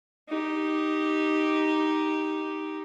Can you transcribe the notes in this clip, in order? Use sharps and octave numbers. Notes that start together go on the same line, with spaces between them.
D#4 G4